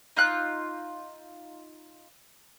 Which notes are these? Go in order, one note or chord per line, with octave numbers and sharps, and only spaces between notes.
D#4 F4 F#6